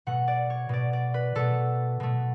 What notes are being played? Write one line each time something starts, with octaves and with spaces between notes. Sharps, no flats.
B2 A3 F#5
D5
C#5
B2 A3 D5
D5
B4
B2 A3 A4
B2 A3